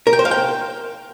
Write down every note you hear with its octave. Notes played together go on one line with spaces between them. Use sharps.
A#4
G5
C5
F5
G5